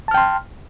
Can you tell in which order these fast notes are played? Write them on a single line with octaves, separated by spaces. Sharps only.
A5 F6 G5 C6